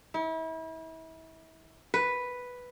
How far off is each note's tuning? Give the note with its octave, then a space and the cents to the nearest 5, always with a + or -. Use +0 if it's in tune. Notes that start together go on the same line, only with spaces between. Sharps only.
E4 -35
B4 +0